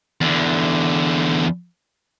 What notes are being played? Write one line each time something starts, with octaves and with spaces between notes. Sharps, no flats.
E2 D3